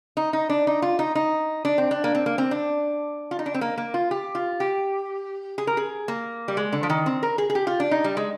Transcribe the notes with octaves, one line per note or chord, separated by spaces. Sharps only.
D#4
D#4
D4
D#4
F4
D#4
D#4
D4
C4
D4
A#3
C4
A#3
C4
D4
F4
D#4
D4
C4
A#3
A#3
F4
G4
F4
G4
G#4
A#4
G#4
A#3
G3
G#3
D3
F3
D#3
C4
A#4
G#4
G#4
G4
F4
D4
D#4
G3
G#3